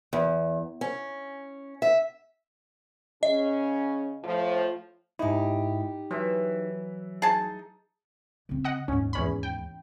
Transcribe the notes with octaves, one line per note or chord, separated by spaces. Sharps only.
E2
C#4
E5
C#3 C#4 D#5
A2 F3
G#2 D#4 E4 G4
E3 F#3 E5
D#4 G#4 A5
C#3 C4
D#5 F#5
D#2 G#2 C#4
E2 C#4 B5
G5